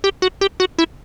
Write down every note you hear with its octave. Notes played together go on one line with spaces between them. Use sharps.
G4
F#4
G4
F#4
E4